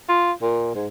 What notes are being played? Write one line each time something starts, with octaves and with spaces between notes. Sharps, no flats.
F4
A#2
G#2